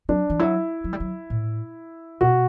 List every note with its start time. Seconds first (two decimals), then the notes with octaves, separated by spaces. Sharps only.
0.09 F#3 D4
0.30 E3
0.39 F#3 E4
0.84 F#3
0.93 G3
1.00 F#3
1.30 A2
2.21 B2 F#4